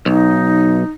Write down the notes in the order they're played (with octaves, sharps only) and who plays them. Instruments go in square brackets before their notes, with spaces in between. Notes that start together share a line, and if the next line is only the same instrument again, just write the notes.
[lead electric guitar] B1 [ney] D#4